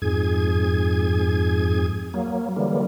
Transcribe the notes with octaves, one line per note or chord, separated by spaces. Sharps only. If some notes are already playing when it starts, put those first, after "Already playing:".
F2 G#2 G#4 G#6
F#3 A#3
D3 E3 F#3 G3 A#3